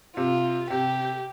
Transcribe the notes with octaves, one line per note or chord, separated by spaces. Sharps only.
C3 F4
C3 G4